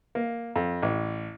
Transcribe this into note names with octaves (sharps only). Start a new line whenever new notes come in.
A#3
F2
A1